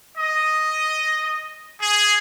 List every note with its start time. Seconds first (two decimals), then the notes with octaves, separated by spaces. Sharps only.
0.18 D#5
1.81 G#4